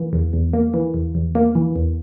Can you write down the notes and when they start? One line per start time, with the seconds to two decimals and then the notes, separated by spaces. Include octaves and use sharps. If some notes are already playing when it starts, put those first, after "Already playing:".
Already playing: E3 A#3
0.13 E2
0.33 E2
0.53 A#3
0.74 E3
0.94 E2
1.15 E2
1.35 A#3
1.55 E3
1.76 E2